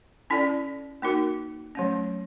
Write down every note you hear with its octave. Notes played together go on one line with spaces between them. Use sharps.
C#4 E4 A4 D5
A#3 D#4 F#4 A#4
F#3 A3 C#4